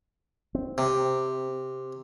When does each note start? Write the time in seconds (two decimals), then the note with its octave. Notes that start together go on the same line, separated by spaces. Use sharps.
0.55 C4
0.78 C3